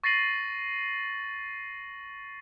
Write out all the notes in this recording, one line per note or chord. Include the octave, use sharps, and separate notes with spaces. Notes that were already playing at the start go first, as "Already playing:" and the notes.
C#6 A6 A#6 C7 D#7 F#7